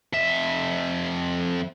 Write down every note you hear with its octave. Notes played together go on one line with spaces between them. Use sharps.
F2 E5